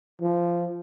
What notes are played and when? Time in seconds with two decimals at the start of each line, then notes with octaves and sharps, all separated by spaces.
0.21 F3